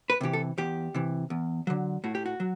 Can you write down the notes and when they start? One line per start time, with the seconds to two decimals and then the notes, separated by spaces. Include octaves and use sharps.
0.10 B4
0.21 C3 E3 G4
0.33 A4
0.58 E2 G4
0.95 C3 E3
1.30 E2
1.67 D3 F#3
2.04 A2 F#4
2.15 G4
2.26 F#4
2.40 F#3